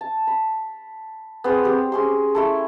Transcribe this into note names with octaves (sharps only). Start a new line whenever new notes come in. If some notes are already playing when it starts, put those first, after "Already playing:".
A5
B5
B3 C4 G#4 C5
G3 C4
C#4 G#4 C6
A3 E4 A4